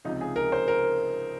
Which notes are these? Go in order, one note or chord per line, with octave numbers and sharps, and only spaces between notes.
C#2 C3 F3 D#4
G#4
A#4
C5
A#4